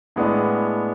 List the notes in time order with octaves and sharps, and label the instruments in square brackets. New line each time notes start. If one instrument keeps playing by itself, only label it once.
[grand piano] A2 G#3 B3 D4